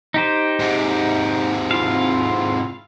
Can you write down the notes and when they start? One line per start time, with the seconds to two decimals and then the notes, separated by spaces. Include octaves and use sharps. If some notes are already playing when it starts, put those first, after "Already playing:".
0.14 D#4 G4 C5
0.60 G#2 C3
1.71 C4 E4 F4 F5